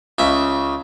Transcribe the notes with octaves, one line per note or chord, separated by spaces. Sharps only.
C#2 C#3 E5